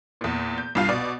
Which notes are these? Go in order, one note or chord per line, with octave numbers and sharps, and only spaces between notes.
E2 A#2
G6
C2 G2 F4 F5
B2 D5